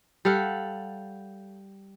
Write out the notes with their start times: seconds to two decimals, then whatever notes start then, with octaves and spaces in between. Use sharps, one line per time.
0.25 G3 A4 F5 F#5